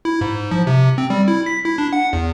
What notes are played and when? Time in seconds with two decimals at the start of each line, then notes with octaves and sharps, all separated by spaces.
0.05 E4
0.21 G#2
0.51 F3
0.67 C3
0.98 C4
1.10 G3
1.28 E4
1.46 B6
1.65 E4
1.78 D4
1.93 F#5
2.13 E2